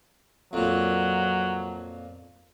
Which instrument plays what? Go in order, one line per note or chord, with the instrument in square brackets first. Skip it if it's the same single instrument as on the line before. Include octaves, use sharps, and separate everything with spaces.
[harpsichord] F2 A#2 [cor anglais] F#3